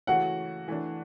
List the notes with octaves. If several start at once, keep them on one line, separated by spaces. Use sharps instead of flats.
C#3 E3 A3 C#4 F#4 F#5
E3 A3 D4